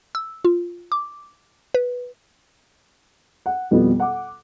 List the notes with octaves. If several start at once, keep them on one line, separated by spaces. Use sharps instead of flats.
E6
F4
D6
B4
F#5
F2 B2 G3 B3
F#5 D6